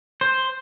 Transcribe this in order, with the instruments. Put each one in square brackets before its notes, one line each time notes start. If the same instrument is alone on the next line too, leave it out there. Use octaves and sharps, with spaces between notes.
[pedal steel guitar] C5